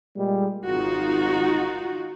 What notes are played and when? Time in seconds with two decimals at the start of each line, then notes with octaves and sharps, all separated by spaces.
0.16 A#2 G3 G#3
0.66 G#1 D#4 F4 F#4